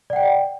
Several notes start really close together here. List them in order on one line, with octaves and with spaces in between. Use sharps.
D5 F#5 G5